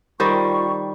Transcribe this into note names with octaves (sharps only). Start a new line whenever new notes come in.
D#3 G3 F4 C5 C#6